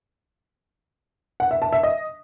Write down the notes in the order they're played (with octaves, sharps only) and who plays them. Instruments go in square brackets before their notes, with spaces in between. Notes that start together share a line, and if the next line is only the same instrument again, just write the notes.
[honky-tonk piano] F#5
E5
A5
E5
D#5